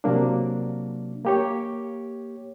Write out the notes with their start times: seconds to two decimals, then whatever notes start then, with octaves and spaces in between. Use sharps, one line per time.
0.04 C3 F#3 A#3 D4
1.25 A#3 G4 C#5